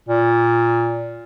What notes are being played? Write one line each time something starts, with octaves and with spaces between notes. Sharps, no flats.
A#2